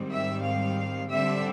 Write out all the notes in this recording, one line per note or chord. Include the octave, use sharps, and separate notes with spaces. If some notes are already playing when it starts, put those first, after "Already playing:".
Already playing: G#2 D#3 G3 C4
E5
F5
D3 G3 C4 E5